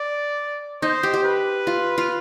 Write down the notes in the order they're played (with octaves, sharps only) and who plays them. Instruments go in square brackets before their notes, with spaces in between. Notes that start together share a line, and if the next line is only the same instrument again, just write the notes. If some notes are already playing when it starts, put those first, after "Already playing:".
Already playing: [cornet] D5
[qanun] D#4 [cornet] C5
[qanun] G4
G4
[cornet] B4
[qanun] F4
F4